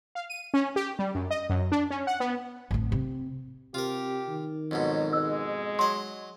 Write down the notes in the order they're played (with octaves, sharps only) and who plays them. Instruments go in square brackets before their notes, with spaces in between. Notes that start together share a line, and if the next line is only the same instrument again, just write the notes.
[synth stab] F5
D#7
C#4
G4
G3
F#2
D#5
F#2
D4
C#4
F#5
B3
[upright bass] A1 F2
C3
[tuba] C3 [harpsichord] F4 A#4 [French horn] G4
[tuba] D#3
[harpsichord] F2 G#2 B2 [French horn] F#3
[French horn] G#3 [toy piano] C5 E6
[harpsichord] F#3 D#5 [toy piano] C6